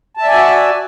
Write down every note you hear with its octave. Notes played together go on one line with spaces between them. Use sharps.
F#4 D5 E5 G#5 A5